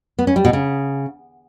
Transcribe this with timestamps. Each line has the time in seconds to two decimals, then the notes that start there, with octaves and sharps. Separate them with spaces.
0.19 B3
0.27 C#4
0.36 G3
0.45 B2
0.53 C#3